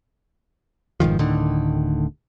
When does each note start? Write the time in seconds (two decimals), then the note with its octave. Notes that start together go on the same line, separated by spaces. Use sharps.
1.00 F1 G#2 D#3 F3
1.19 D1 A2 D3 D#3